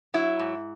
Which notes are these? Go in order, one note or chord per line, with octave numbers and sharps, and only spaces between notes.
F#3 E4
G#2